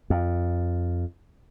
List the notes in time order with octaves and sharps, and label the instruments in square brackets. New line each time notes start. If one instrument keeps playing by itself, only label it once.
[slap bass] F2